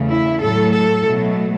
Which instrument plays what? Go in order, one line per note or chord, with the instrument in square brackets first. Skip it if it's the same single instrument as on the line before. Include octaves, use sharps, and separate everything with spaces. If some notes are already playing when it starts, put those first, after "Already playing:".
Already playing: [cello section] E2 C#3 A3
E4
A2 F#3 A3 A4
A4
B2 F#3 A3